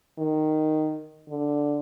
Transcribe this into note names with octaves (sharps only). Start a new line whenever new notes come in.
D#3
D3